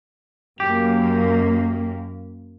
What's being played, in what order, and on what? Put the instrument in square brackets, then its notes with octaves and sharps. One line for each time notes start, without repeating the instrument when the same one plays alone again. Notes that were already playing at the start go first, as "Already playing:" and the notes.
[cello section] F#2 A#3 [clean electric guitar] G4